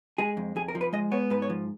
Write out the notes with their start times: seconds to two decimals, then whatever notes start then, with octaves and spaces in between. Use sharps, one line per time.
0.18 G#3 G#4
0.37 F2
0.56 F2 G#4
0.68 A#4
0.75 F3
0.81 B4
0.93 G#3 D#5
1.12 B3 C#5
1.30 G#2 B4
1.42 C#5
1.50 F3